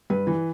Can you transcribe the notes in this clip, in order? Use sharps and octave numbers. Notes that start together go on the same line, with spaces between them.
G2 B4
E3